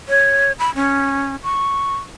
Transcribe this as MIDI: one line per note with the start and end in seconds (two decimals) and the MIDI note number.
0.09 0.52 73
0.59 0.73 83
0.75 1.36 61
1.43 1.95 85